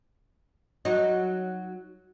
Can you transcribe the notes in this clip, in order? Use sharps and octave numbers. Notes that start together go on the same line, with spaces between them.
F#3 D#4